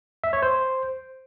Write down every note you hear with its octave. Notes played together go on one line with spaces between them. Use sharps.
E5
C#5
C5